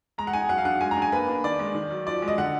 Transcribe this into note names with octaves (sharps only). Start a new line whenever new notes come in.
G#3 A#5
F#5
D#4 G#5
F#3 F#5
F5
D4 F#5
G#3 G#5
A#5
D4
G#5
A#3 B4
D4
D#3 D5
G#3
D#3
F#3
F3 D5
G#3
D#5
D3 F#5